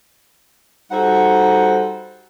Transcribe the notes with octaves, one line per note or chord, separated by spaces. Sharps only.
G3 D#4 F#4 A4 C5 F#5